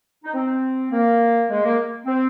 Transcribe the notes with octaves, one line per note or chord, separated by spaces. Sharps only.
D#4
C4
A#3
G#3
A#3
C4